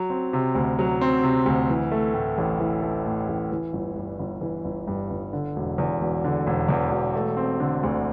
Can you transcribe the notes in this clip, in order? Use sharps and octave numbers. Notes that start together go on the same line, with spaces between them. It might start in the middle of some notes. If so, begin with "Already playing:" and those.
Already playing: F#3
C4
C3
D2
F#3
C4
C3
D2
E3
A3
A2
A1
E3
A3
A2
A1
E3
G1
G2
G1
E3
G1
G2
G1
D3
E1
E2
E1
D3
E1
E2
E1
A3
C4
D3
D2